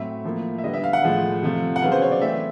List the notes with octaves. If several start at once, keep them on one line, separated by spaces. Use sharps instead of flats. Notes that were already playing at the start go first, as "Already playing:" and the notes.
Already playing: A2 F#3 A3 C4 E5
A2 F3 A#3
E5
D3 G3 B3 D#5
E5
F5
F#5
A2 F3 G#3
C3 F3 A3
F#5
C#3 F#3 B3 F5
C5
C#5
D5
E3 A3 C4 E5